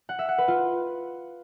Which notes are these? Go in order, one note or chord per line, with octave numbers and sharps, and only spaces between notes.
F#5
E5
F#5
B4
F4